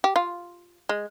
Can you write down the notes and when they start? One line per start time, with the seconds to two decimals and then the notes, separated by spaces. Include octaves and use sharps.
0.04 G4
0.16 F4
0.89 G#3